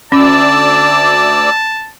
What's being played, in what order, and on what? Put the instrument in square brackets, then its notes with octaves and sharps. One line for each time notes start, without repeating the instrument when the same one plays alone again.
[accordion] D2 D5 E6 [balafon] C#4 [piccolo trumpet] A5